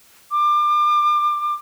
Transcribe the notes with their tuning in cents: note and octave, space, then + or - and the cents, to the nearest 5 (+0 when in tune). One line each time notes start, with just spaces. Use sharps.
D6 +30